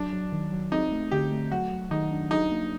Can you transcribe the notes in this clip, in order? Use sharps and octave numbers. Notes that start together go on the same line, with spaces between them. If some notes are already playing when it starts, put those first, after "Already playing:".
Already playing: F#3 D4
F#3
D#3
F#3
C4 D#4
A3
D3 G4
A3
F#3 F#4
F#3
D#3 D#4
D4
F#3 D#4
A#3